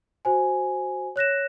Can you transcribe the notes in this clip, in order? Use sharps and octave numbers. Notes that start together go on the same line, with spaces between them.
F#4 C5 G#5
C#5 F#6 A#6 E7